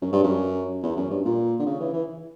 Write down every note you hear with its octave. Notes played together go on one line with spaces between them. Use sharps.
F#2
G2
F#2
E2
F#2
G2
A#2
D3
C#3
E3
E3